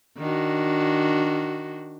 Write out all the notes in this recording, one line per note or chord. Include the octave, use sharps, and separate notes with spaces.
D#3 D4 F#4